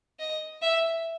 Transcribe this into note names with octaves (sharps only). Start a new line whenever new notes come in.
D#5
E5